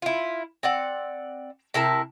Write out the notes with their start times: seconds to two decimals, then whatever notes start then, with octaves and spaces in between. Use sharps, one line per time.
0.02 E4 F4
0.63 C4 D5 F#5
1.74 C3 E4 A#4 A5